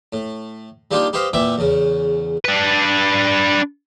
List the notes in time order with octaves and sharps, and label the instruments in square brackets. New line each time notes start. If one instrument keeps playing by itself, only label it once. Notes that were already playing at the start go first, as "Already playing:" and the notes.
[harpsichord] A2
G3 A#3 D4 D#4 F4 G4
G4 B4 C5 D#5 F5
A#2 E3 B3 E5 G5 D6
E2 C#3
[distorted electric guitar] D4 B4